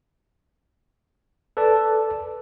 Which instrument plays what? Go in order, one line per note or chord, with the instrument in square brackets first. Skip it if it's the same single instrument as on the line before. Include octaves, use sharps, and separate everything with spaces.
[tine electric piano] A4 B4 D5 A5